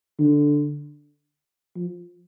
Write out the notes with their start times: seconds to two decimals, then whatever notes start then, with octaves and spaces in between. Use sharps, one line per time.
0.19 D3
1.76 F3